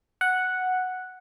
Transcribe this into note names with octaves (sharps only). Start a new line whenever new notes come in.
F#5